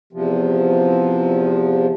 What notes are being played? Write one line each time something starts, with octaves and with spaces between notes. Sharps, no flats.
E2 C3 F3